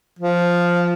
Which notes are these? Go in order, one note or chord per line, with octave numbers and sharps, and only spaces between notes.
F3